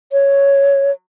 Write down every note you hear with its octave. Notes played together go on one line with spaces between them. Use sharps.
C#5